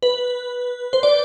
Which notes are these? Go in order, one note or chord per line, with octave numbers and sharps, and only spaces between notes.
B4
C5
D5